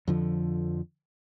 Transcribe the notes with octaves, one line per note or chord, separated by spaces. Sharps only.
F2 D3 F3